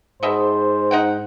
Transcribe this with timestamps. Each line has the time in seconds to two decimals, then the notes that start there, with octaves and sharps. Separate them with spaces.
0.23 G#2 B2 C5 D#5 E5
0.91 D#4 F#5 G5